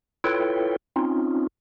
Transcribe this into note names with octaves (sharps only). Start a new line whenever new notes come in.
E4 F4 A4 B4 C#5 G5
C4 C#4 D#4 F4